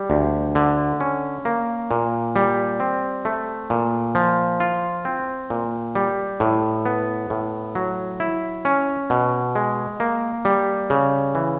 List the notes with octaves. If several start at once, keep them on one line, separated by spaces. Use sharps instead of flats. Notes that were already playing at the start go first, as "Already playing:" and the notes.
Already playing: G3
D2
D3
C#4
A#3
A#2
G3
C4
A3
A#2
F3
F4
C4
A#2
G3
A2
B3
A2
F#3
E4
C#4
B2
G#3
A#3
G3
C#3
E3